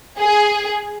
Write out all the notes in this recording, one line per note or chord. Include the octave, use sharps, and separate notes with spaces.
G#4